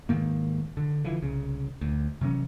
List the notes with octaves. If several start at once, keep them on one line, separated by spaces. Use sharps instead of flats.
G#2 D#3 A#3
D3
D3 E3 F3
C2 C#3
D2
C3 E3 F#3 C#4